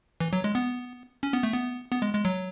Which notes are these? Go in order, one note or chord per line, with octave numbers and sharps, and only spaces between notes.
E3
F#3
G#3
B3
C#4
B3
A3
B3
B3
G#3
G#3
F#3